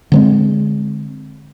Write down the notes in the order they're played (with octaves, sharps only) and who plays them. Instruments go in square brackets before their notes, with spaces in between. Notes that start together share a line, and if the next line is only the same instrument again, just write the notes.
[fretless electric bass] D3 G#3 C4